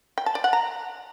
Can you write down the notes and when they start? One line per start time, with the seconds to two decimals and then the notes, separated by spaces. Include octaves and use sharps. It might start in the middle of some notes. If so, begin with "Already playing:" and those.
0.18 G5
0.26 A5
0.35 D5
0.44 F#5
0.53 A#5